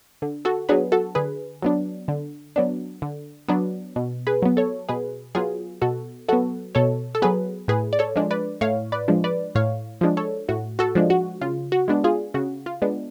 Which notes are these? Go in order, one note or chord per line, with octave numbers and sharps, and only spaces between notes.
D3
F#4 A4
F#3 B3 D4 G#4 B4
F#4 A4
D3 G#4 B4
F#3 B3 D4
D3
F#3 B3 D4
D3
F#3 B3 D4
B2
G#4 B4
F#3 B3
A4 C#5
B2 G#4 B4
F#3 B3 F4 G#4
B2 F#4 A4
F#3 B3 F#4 A4
B2 A4 C#5
A4
F#3 B3 G#4 B4
A2 G#4 B4
D5
A4 C#5
F3 G#3 D4
B4 D5
A2 C#5 F5
B4 D5
F3 G#3 D4
B4 D5
A2 C#5 F5
F3 G#3 D4
A4 C#5
A2 F#4
F#4 A4
F3 G#3 D4
F#4
C#3 F4
F#4
G#3 B3 D4
F4 G#4
C#3 F#4
F4
G#3 B3 D4